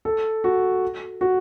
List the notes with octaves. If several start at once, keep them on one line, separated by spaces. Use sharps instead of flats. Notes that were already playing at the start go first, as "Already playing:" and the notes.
A4
F#4
F#4